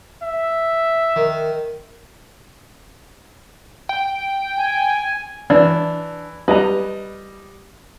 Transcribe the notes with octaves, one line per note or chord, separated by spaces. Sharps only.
E5
D#3
G5
G#5
E3 D4
G3 B4 D#5 A#5